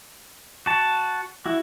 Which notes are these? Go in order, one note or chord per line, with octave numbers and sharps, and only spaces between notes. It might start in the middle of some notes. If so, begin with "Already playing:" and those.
F#4 A5
E4 F#4